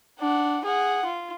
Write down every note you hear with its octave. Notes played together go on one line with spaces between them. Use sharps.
D4 F#5
G#4 F#5
F4